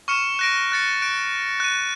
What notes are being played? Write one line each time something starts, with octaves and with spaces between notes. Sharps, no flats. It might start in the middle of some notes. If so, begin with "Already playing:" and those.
C#6 F6 C#7 E7
F#6 A#6 D7
F#6 A6 C#7
F#6 D7
F#6 D#7